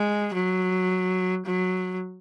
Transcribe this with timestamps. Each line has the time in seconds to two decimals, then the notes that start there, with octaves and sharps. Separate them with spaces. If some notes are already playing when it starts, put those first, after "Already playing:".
Already playing: G#3
0.34 F#3
1.46 F#3